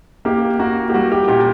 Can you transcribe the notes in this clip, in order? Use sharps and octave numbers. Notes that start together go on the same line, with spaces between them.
A#3 G4
A#3 F#4
G4
G3 F#4
G4
A#2 G4